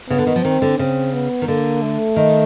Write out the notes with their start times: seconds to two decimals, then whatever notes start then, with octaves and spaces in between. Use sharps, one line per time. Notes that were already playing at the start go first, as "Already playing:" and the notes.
0.10 C#3 B3
0.18 D3
0.27 D#3
0.36 F3
0.44 D#3 C4
0.62 D3
0.79 C#3 C4
1.13 B3
1.42 D#3
1.48 D3 A#3
1.82 A3
2.16 D#3